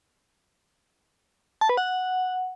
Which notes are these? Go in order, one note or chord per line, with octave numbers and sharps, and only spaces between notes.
A5
B4
F#5